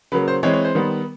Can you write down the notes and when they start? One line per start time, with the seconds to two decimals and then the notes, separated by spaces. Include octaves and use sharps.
0.12 C#3 F#3 A#3 B4
0.28 C5
0.43 E3 G#3 C4 C#5
0.53 C#5
0.65 C5
0.75 D#3 G3 B3